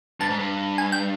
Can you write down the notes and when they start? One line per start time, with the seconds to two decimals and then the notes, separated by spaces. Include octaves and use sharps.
0.20 G2 A5
0.30 G#2
0.39 G2
0.78 G#5
0.92 G5